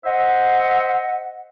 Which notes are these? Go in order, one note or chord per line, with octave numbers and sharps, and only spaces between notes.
C5 D#5 E5 F#5